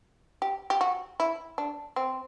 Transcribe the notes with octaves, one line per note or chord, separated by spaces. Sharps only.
G4
G4
F#4
E4
D4
C4